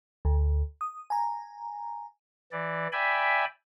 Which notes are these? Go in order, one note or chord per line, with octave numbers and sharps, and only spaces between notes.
D2
D#6
G#5 A#5
E3 D5
D5 E5 G5 G#5 B5